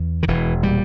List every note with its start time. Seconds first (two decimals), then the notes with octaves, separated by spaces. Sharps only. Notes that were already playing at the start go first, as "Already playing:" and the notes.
Already playing: E2
0.23 D#3
0.27 E1 E3
0.63 A#2 G3